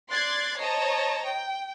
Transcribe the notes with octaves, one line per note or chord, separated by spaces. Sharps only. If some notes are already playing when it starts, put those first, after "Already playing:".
D5 C6 F#6 G#6 A6 C7
C5 C#5 D#5 A5 A#5
G5